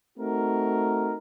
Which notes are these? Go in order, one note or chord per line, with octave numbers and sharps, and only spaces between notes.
A3 C4 D#4 F#4 A#4